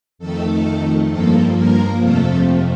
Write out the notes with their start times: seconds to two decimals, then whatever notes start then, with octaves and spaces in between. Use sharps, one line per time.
0.18 F2 D#3 A3 A4
1.10 G2 F3 A#3 A4
1.55 A#4
2.00 F2 C3 F3 A3 A4